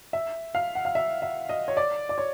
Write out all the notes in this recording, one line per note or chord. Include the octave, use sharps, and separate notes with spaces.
E5
F5
F#5
F5
E5
E5
D#5
C#5
D5
D5
C#5